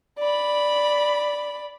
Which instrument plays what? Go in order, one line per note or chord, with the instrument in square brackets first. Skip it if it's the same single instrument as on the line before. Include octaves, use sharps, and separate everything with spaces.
[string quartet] D5 B5